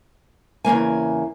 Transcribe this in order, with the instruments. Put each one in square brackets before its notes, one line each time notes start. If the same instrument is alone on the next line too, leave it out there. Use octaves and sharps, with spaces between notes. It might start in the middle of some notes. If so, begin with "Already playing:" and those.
[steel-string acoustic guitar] E2 C#3 A#3 G#5